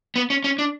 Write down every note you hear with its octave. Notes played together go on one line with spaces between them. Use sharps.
B3
C#4
C#4
D4